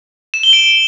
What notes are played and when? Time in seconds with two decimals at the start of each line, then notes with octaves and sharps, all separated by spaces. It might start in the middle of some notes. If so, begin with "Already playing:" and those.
0.34 E7
0.43 G7
0.53 D7